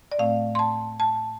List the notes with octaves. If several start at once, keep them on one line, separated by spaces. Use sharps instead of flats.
D5
A2 A3 C4 F5
C6
A5
A5